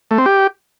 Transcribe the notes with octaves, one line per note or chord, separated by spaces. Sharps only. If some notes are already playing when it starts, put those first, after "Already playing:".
A3
C4
G4